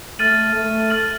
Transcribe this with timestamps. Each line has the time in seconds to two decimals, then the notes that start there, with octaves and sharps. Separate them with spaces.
0.19 A3 F6 A6 D#7 F#7
0.55 A3
0.90 F6 A6 D#7 F#7